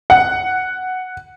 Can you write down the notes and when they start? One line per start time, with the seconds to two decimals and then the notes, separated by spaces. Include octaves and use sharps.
0.10 F#5